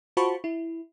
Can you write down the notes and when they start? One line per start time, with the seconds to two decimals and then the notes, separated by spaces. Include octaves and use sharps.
0.17 F4 F#4 C5 A5 B5 C#6
0.44 E4